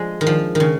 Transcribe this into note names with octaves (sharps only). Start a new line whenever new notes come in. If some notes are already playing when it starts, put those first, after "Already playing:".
Already playing: F3 G#3
D#3
F3
D#3
C#3